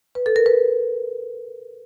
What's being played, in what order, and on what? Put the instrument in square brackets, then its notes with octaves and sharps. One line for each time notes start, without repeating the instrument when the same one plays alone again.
[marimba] B4
A4
A#4
B4